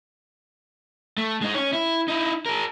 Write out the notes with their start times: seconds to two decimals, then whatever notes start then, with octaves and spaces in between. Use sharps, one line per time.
1.17 A3
1.42 G#3 D#4
1.54 C#4 C#5
1.73 E4
2.08 D#4 E4
2.46 G#4 A#4